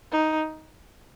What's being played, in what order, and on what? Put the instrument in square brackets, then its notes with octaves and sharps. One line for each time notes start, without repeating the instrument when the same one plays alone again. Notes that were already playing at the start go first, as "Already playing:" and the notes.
[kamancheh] D#4